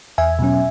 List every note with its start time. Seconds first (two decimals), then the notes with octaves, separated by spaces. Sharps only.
0.18 E2 E5 G#5
0.39 B2 F#3 C#4